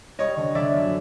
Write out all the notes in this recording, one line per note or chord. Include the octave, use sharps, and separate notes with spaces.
G3 C#5 D#5
D3
D3 D5 E5
F#2